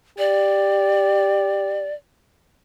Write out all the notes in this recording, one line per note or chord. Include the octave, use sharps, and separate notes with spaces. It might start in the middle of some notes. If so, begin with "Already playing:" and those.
G4 D5